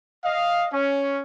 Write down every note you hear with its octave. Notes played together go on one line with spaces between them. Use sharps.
D#5 F5
C#4